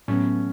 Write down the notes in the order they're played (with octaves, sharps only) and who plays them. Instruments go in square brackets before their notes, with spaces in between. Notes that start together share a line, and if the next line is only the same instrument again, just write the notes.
[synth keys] A2 F#3 B3 [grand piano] C#4